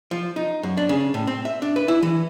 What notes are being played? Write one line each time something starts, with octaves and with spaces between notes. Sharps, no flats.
F3
D#4
F#2
D4
C#3
A2
C4
E5
D4
B4
E4
E3